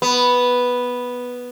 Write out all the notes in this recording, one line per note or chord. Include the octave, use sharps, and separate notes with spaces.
B3